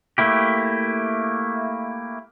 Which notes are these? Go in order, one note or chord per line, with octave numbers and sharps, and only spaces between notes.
A3 A#3 E4 G4